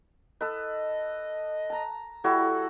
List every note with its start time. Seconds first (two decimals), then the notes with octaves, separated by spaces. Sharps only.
0.41 A4 B4 D#5
1.70 A5 A#5
2.24 G3 E4 F#4 A4